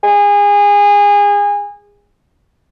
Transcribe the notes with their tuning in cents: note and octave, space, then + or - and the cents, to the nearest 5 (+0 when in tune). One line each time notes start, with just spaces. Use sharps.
G#4 -25